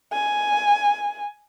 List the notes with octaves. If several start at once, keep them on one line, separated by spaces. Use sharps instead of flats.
G#5